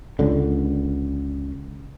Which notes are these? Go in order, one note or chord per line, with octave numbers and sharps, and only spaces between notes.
C#2 D3